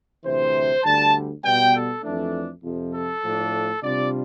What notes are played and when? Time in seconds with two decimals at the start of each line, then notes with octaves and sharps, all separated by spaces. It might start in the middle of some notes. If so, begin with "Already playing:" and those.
0.23 D2 C3 E3 C5
0.83 D2 D3 G3 A5
1.43 B2 G3 B3 G5
1.74 A4
2.02 F2 E3 A3 D4
2.63 F2 C3 F3
2.92 A4
3.22 A2 F3 A3 D4
3.82 C3 G3 D4 F4 D5